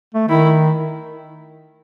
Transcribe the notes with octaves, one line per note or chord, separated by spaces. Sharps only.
A3
D#3 E4